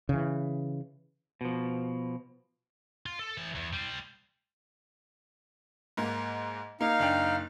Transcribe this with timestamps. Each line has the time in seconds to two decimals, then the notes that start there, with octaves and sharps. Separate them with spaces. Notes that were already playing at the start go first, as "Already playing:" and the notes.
0.09 C#3 E3
1.41 B2 F3
3.06 F4
3.19 A4
3.37 E3 A5
3.55 E2
3.73 G3 C5
5.97 G#2 A#3
6.81 A#3 D#4 F5
6.99 F#1 D4 G5